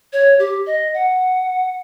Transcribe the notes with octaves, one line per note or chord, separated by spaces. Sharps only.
C#5
G4
D#5
F#5